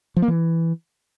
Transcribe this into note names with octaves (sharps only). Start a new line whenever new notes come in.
F3
A#3
E3